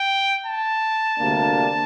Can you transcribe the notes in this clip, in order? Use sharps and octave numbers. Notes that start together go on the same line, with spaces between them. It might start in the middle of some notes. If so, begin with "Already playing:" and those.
Already playing: G5
A5
D2 C3 G3 A#3 D4